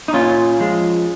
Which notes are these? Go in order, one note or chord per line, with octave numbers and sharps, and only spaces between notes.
D#4
A#2 C#4 F4
F3 G#3